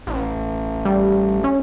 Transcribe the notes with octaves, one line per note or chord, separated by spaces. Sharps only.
A1
G3
C#4